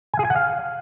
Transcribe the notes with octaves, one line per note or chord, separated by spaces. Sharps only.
G#5
G#4
G#5
F#5
F5